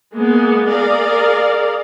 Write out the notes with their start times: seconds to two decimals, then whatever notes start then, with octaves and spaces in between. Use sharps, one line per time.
0.15 G#3 A#3 B3
0.67 G#4 A#4 D5 F5